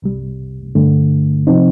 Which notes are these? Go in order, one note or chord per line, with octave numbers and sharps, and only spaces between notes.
C2 C3 G3
G2 D3 A3
C3 F3 C4 D#4